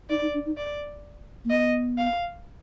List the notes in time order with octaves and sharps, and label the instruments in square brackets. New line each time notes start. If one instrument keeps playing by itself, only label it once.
[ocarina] D#4 [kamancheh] D5
[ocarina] D#4
D4
D#4
[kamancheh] D5
[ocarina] A#3
[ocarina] B3 [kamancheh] D#5
[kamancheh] F5